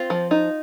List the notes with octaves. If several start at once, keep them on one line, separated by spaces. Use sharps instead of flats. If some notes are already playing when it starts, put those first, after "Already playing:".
Already playing: C4 F4
F3
D#4